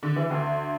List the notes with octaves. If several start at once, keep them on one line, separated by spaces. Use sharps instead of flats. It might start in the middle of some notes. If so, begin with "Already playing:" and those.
D3
E3
D2 D3